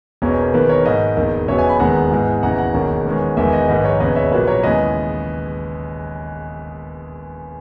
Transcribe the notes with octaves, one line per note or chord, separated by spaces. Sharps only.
E1 E2 B2 A#3 C#4 A#4
A#4
E1 E2 D#3 A#3 B4
A#4 C#5
G#2 D#3 A#3 B4 D#5
E1 D#2 D#3
E1 E2 C#3 F#3 B3 C#5 E5
E5 G#5
G#5 B5
E1 D#2 D#3 G#3 B3 F#5 A#5
G#2 E3 G#3 B3
E1 D#2 C#3 E3 F#5 A#5
F#5 A#5
E1 D#2 D#3 A#3 C#4
E2 D#3 G#3 C#4
E1 E2 D#3 G#3 E5 G#5
D#5 F#5
A#1 G#2 D#3 B4 D#5
A#4 C#5
E1 D#2 C#3 B4 D#5
C#5 E5
A#1 A#2 F#3 A#3 B4
A#4 C#5
D#2 C#3 E3 G#3 B3 B4 D#5